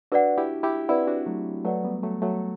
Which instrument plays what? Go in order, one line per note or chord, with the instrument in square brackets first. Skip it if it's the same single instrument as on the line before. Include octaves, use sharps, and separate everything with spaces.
[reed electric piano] D4 F#4 [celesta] B4 D5 F#5
[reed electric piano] E4 G4
E4 G4
[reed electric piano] C4 E4 [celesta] B4 D5 F#5
[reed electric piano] D4 F#4
F#3 A3
[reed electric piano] F#3 A3 [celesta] B4 D5 F#5
[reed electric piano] G3 B3
F#3 A3
F#3 A3